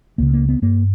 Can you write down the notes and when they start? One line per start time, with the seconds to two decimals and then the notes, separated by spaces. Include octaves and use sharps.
0.18 C#2 C#3 A#3
0.33 A#3
0.49 B3
0.62 G2 A#3